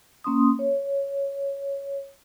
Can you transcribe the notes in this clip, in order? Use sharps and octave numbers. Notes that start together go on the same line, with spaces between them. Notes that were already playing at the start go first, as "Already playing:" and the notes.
A#3 C#4 C6 D#6
C#5